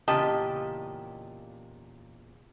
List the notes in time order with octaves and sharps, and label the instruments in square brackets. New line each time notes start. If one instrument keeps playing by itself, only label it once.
[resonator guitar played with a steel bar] E2 A#2 C#3 G4 D#5 A5